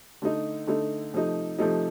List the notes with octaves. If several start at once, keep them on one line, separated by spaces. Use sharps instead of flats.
D3 A3 D#4
D3 A3 D#4
C3 F3 A3 D#4
C3 F3 A3 D#4